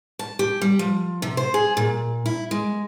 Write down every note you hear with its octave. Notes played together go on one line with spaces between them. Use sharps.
A5
G4
G3
F3
C3
C5
G#4
A#2
E4
G#3